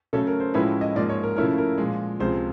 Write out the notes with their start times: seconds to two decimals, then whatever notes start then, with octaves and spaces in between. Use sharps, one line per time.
0.13 C#3 F#3 A3 C#4 A4
0.27 A#4
0.40 C5
0.54 A2 F3 G#3 C#4 E4 B4
0.81 D#5
0.96 G#2 F3 A#3 D5
1.10 C#5
1.23 A#4
1.36 C#3 F3 A3 C#4 E4 A#4
1.58 A#4
1.78 A#2 F3 G#3
2.20 C#2 C3 F3 G#3 C5